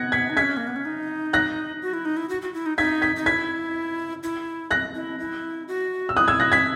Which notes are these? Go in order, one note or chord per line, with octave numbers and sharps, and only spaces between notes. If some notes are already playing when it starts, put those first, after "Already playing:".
Already playing: B3 F#6 G#6 A#6 C#7
G#6 B6
D#4
C#4 G#6 B6
A#3
B3
C#4
D#4
F#6 A#6
F#4
E4
D#4
E4
F#4
F#4
E4
D#4
D#4 G#6 B6
G#6 B6
D#4
E4 G#6 B6
E4
F#6 A#6
E4
E4
F#4
E6
E4 D#6 F#6
E6 G#6
F#6 A#6
G#6 B6